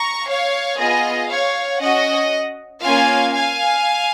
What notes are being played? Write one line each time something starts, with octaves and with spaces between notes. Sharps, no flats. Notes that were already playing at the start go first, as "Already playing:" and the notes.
Already playing: A#5 C#6
C#5 F5
B3 F4 G#4 D#5
C#5 F5
C#4 F#4 D#5 F#5
A#3 C#4 F4 F5 G#5
F5 G#5